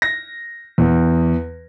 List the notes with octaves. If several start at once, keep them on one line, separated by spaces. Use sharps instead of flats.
A#6
E2